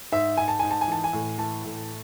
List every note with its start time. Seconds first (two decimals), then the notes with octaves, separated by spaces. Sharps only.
0.12 G#2 E5
0.37 G#2 G#5
0.48 A5
0.59 G#2 G#5
0.71 A5
0.81 G#5
0.88 E3 A5
1.04 G#5
1.13 A2
1.38 E3 A5
1.64 A2